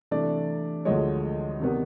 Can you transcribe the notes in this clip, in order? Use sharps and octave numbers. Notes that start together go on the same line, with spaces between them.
C3 E3 A3 D4 D5
D2 D3 F3 G#3 C#5 D#5
C3 D#3 G3 B3